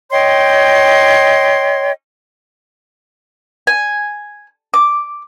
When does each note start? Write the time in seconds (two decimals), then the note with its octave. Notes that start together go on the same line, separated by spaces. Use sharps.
0.12 C#5 D#5 G5 C6
3.67 G#5
4.74 D6